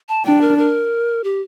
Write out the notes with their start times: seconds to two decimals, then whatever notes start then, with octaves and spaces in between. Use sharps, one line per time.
0.09 A5
0.25 D4 G5
0.41 A#4
0.58 A#4
1.24 G4